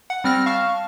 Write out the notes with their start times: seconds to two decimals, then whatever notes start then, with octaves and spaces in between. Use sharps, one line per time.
0.10 F#5
0.24 G3 C4 F6 F#6 A#6
0.46 F5 A5 C#6 F6